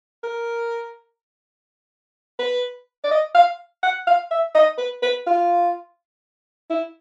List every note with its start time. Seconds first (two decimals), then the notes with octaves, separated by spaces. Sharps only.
0.24 A#4
2.39 B4
3.04 D5
3.11 D#5
3.34 F5
3.83 F#5
4.07 F5
4.31 E5
4.55 D#5
4.78 B4
5.03 B4
5.27 F4
6.70 E4